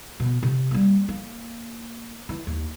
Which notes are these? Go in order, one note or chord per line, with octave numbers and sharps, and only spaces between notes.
B2
C3
G3 A#3
A#3
E3
D#2